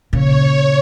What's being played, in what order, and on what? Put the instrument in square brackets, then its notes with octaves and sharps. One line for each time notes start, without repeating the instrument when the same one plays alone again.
[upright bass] A#2 C#3 [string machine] C#5